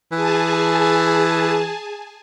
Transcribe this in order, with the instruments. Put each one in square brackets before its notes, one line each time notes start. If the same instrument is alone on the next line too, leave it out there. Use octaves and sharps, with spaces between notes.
[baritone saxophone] E3 [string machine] G#4 G#5 A5